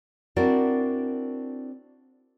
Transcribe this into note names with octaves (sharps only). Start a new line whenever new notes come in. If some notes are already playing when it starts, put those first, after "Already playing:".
C4 D4 E4 F#4 A#4 D5